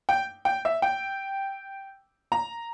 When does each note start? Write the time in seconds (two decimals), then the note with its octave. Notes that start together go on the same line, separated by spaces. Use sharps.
0.09 G5
0.45 G5
0.65 E5
0.82 G5
2.32 A#5